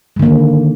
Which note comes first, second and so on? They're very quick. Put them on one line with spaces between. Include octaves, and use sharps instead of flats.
G#3 D3 A#3 D#3